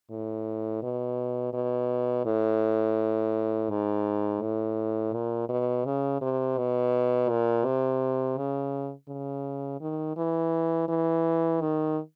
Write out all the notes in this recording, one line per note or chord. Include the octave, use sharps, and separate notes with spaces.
A2
B2
B2
A2
G#2
A2
A#2
B2
C#3
C3
B2
A#2
C3
C#3
C#3
D#3
E3
E3
D#3